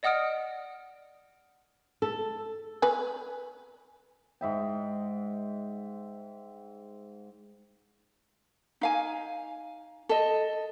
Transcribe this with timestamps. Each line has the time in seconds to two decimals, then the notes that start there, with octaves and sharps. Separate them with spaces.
0.03 D5 D#5 F#5 D#6 F6 D7
2.02 A4
2.82 B4 G#5
4.41 G#2 E5 G5
8.81 D#4 F5 G#5
10.09 A4 D#5